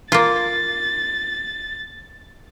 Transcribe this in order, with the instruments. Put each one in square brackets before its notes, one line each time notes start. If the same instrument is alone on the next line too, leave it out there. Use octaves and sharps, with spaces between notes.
[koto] A#3 F4 [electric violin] A6